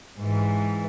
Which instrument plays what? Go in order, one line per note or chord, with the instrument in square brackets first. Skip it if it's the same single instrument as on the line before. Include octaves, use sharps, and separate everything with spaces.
[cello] G#2 E3